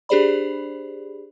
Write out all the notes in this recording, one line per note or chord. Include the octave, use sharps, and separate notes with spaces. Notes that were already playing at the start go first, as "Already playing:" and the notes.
D4 G4 G#4 C5 D5 B5